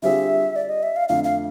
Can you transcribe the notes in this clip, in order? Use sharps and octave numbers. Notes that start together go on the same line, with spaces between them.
D3 G3 C4 F4 G#4 E5
D5
D#5
E5
F5
F2 D3 F3 A3 F5
F5